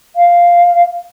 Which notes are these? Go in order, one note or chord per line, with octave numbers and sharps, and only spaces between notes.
F5